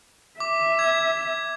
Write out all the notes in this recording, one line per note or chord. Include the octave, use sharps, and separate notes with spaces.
E5 D6
G#6